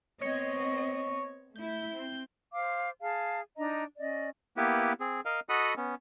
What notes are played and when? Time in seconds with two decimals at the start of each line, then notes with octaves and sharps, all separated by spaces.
0.21 B3 C4 C#5 D#5
1.56 A3 E4 G6
1.93 C4
2.53 C5 F5 D6
3.01 G#4 F5 A5
3.57 D4 D#4 D#5 A#5
3.98 C#4 D5 D#5
4.57 A#3 B3 E4 G4 B4
5.00 C4 G#4
5.25 A#4 D#5 F5
5.49 F#4 A4 D#5 F#5 B5 D#6
5.77 B3 C#4